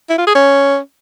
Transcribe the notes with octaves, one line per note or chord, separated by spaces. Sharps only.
E4
F4
G#4
C#4